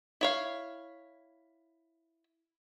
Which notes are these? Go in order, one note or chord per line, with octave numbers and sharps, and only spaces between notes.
E4 C#5 F5